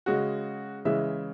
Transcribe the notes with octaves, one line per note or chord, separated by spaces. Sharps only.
C#3 G#3 F#4
C#3 E3 G#3 E5